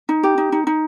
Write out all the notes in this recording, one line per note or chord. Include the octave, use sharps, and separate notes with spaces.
D#4
G4
D#4
D#4
D#4